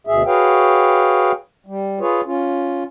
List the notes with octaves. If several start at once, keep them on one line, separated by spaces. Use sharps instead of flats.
D2 B2 G#4 E5
F#4 G#4 B4 C#5 F5 G5
G3
F4 G#4 B4 C#5
C#4 F4